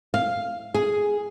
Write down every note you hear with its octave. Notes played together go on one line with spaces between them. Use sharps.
F5
G#4